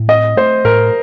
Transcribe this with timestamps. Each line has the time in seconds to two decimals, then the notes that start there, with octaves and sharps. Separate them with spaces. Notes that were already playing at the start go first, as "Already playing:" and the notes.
Already playing: A2
0.08 C4 D#5
0.37 A3 C5
0.64 A2 A#4